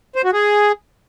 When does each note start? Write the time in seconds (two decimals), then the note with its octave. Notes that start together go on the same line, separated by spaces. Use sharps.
0.15 C5
0.24 F#4
0.33 G#4